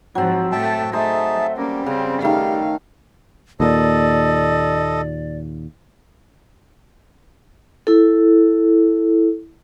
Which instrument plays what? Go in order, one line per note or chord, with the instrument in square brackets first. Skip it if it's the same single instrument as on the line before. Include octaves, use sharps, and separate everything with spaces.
[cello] G#2 F3 [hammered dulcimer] F#3 C4
[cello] A2 A3 [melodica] E5 G5 A5
[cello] A3 [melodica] D#4 G#4 A5 [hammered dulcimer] C5 [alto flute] E5
[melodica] G3 [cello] A#3 [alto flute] C#4
[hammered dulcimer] C#3 [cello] C4
[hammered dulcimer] D#3 A3 [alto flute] G4 [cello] F5
[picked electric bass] D#2 A#2 [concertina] A4 D#5 [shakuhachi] D5
[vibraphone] E4 A4